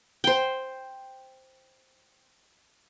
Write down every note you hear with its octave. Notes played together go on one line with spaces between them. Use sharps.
C5 G5